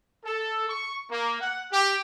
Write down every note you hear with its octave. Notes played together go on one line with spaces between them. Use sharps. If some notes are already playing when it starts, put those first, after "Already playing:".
A4
C#6
A#3
F#5
G4